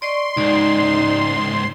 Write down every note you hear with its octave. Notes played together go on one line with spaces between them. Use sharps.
D5 D#5 C6 C#6
C#2 G#2 D#4 D5